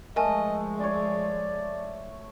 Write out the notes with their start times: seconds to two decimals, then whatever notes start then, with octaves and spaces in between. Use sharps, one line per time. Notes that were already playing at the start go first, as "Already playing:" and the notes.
0.16 F3 G#3 A3 A#4 D#5 G#5 A5
0.80 C#5 D5 C6